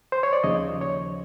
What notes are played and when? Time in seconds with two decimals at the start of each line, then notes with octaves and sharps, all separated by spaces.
0.12 C5
0.23 C#5
0.33 D5
0.44 D#2 C#3 F3 D#5
0.81 C#5